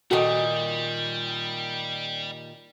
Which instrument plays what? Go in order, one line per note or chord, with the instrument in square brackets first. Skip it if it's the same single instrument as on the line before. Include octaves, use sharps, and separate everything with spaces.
[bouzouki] A#2 D#3 [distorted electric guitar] G3 [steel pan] F#4 A4 G5